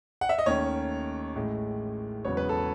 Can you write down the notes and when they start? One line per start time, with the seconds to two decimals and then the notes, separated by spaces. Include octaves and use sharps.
0.21 F#5
0.29 E5
0.39 D#5
0.46 D#2 D#3 A3 C#4 C#5
1.35 A1 A2 G#3
2.25 E1 E2 C#3 F#3 B3 C#5
2.37 B4
2.49 A4